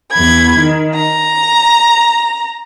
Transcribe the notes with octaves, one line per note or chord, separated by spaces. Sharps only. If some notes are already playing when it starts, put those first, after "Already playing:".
E2 B5 G#6
D#3
A#5